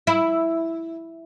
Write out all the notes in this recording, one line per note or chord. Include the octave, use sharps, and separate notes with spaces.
E4